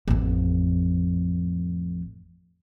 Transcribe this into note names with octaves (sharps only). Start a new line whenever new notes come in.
A1 F2